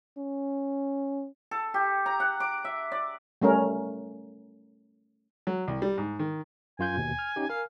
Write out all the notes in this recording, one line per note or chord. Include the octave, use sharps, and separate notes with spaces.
C#4
A4
G4
A#5
F#5
D6
E5
D5
G3 A3 C#4 A#4
F#3
C2
G3
G#2
D#3
F#2 F4 G#5 G6
D#2 B2
F6
C#4 D#4 G4
A#4 F5 G#5